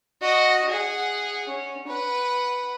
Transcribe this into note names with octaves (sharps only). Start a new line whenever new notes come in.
F#4 D#5
G#4 F#5
C#4
B4 F#5